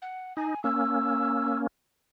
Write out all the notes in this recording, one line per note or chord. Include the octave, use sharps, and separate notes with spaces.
F#5
D#4 G#5
A#3 C#4 E6